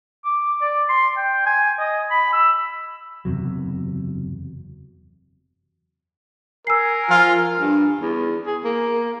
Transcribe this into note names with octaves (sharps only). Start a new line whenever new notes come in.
D6
D5
C6
G5
G#5
D#5
B5
E6
F#1 E2 C3 F#3
A#4 G#5 E6 C7
F3 F4
G2
E2
G#4
A#3